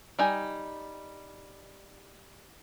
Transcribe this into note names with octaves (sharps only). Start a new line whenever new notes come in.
G3 D#4 G#5